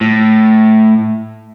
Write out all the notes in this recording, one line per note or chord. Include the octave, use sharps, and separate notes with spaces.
A2